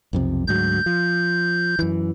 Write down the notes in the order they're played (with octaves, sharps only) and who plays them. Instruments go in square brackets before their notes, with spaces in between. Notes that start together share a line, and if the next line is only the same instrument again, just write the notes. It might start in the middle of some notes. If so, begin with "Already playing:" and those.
[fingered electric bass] B1 F2 C3
[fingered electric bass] D2 G#2 F#3 [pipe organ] G6
[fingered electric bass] F3
F#2 E3